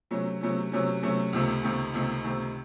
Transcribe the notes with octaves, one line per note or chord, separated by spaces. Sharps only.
C3 F#3 A3 C#4
C3 F#3 A3 C#4
C3 F#3 A3 C#4
C3 F#3 A3 C#4
C#2 C3 D#3 A3
C#2 C3 D#3 A3
C#2 C3 D#3 A3
C#2 C3 D#3 A3